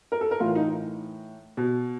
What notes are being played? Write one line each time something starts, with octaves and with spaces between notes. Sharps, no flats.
A#4
A4
A#4
A2 E3 F4
D#4
B2